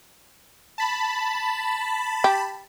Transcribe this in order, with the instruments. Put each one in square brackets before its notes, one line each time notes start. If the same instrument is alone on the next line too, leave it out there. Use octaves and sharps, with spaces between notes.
[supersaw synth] A5 B5
[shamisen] G4